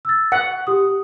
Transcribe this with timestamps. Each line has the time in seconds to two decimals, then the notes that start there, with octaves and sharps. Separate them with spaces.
0.05 E6 A6
0.32 F#5 C#7
0.67 G4 D#6